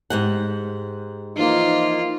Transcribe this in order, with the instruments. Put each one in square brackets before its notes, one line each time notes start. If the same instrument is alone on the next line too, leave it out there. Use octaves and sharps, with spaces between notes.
[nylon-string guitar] G#2 G4 F#5
[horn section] E3 F3 A#3 [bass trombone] D#4 [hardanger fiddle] F4